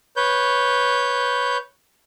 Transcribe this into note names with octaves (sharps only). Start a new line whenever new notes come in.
B4 C#5 G6